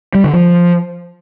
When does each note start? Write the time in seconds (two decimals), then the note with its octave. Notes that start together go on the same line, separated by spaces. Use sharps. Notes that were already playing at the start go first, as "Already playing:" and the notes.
0.15 G3
0.24 D3
0.34 F3